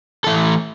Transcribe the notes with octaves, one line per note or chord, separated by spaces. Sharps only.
E3 A3 A4